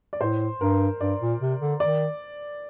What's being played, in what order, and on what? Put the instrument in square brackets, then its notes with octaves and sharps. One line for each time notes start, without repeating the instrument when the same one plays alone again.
[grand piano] D5
[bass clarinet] A2 [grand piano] C5
[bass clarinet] G2 [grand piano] A#4
[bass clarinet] G2 [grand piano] D5
[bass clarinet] A#2
C3
D3
[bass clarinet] D#3 [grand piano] D5